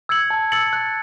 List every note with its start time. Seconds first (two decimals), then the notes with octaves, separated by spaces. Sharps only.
0.09 E6 G#6 C#7 F#7
0.30 A5
0.52 E6 A6 C#7 F#7
0.73 F#6